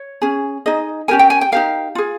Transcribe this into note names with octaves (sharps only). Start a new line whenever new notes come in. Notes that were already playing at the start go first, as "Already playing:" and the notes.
Already playing: C#5
C#4 G#4
D#4 G#4 D#5
C#4 G4 A#4 G#5
G5
G#5
G5
D#4 G4 A#4 F5
F4 G#4